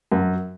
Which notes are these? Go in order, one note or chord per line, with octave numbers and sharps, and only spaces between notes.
F#2